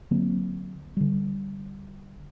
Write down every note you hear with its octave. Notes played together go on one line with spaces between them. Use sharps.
D3 F#3 A#3 C4
D3 G3